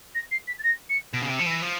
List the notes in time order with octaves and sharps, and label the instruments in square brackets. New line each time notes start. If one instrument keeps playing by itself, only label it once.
[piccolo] A#6
C7
B6
A6
A#6
C#7
[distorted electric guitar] B2 [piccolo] D7
[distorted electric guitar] C#3
[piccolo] D7
[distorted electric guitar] C3
[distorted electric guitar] F3 [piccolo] C#7
[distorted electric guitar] E3 [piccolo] A#6
[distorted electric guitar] F3